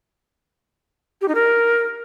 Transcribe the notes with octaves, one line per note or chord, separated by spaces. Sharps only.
G4
D#4
A#4